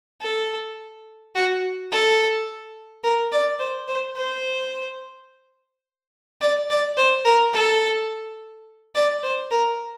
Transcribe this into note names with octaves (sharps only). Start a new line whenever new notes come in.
A4
F#4
A4
A#4
D5
C5
C5
C5
D5
D5
C5
A#4
A4
D5
C5
A#4